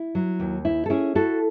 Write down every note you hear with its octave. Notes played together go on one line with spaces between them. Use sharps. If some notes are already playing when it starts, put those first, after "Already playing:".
Already playing: E4
F#3
D#2
E4
A4
C#4 E4 G#4
E4 F#4 A4